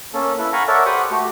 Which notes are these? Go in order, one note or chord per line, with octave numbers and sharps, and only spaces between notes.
A#3 C#4 A4
E4 A4 B4
F5 F#5 G#5 A#5 B5 C#6
A4 A#4 C#5 D5 E5 F#5
G4 C5 F#5 B5 C#6 D#6
A3 F#4 G4